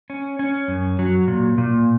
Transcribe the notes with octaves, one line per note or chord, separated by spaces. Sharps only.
C#4
C#4
F#2
F#3
A#2
A#2